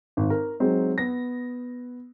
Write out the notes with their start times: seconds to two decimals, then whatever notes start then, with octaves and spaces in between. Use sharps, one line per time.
0.17 G#1
0.30 A#4
0.60 F#3 G#3 C4 D#4
0.98 B3 A#6